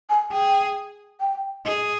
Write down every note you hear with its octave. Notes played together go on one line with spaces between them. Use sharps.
G#5
G#4 G5
G5
G#4 D#5